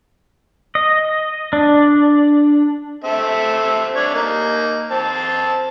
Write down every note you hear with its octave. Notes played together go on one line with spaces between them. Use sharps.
D#5
D4
C4 A4 E5
D4 C#5
A#3 D#4
C4 A5